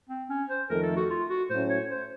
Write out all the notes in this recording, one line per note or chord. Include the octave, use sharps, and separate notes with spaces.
C4
C#4
C5
F2 D#3 A3 A#4
A4
F#4
F4
F#4
A2 F#3 A3 C#4 C5
C#5
C5